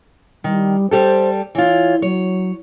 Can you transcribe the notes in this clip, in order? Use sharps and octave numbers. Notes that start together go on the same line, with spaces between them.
D#3 G3
G3 G4 A4 C5
E3 F4 C#5
F#3 C#5